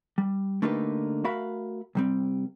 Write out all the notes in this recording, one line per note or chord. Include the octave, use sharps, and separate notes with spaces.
G3
D3 A3 A#3 D#4 G4 B4
A3 F#4 A#4 E5 F5 B5
C2 G3 C4